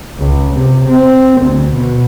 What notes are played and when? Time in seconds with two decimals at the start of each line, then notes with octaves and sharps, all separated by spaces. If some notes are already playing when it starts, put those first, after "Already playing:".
0.18 C#2
0.54 C3
0.89 C4
1.41 D2
1.72 B2